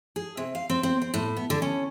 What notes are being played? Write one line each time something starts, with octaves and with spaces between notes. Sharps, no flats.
G#4
C3
F5
C4
C4
C4
A2
B3
D3
C#4